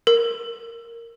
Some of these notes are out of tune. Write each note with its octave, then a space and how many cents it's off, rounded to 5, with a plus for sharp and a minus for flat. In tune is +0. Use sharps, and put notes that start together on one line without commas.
A#4 -5